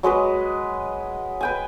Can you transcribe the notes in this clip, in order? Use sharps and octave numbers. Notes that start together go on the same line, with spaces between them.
F#3 G#3 B4 D#5
B4 G5 G#5